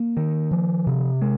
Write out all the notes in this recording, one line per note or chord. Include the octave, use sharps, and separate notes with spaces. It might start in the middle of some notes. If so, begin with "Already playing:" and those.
Already playing: A#3
D#3
F3
C3
G#3